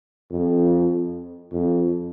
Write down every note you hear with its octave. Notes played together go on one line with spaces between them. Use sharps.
F2
F2